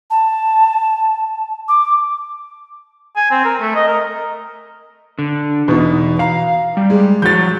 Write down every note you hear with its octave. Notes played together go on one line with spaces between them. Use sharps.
A5
D6
G#5
C4
A#4
A3
D#5
A#4
D3
E2 B2 B3 D#4
F5 A#5
G3
G#3
F3 F#4 G6 A6